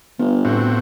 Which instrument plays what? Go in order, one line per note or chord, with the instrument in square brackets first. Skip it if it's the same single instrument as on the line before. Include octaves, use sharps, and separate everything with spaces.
[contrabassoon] G1 [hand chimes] B3
[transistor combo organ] A2 C4 F#4